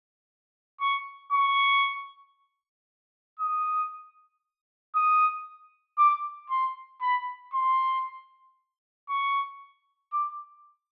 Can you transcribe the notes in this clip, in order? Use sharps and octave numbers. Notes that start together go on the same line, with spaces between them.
C#6
C#6
D#6
D#6
D6
C6
B5
C6
C#6
D6